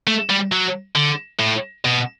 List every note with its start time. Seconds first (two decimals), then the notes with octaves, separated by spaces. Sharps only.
0.07 A3
0.29 G3
0.52 F#3
0.95 D3
1.39 A2
1.84 B2